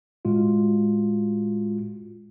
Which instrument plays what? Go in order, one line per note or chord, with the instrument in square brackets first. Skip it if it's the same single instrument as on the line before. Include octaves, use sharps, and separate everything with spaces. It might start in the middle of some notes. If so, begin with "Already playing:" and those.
[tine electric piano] A2 G#3 F4 F#4